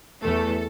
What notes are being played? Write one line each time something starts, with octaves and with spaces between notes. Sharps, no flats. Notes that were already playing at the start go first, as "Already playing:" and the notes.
E2 E3 A3 A4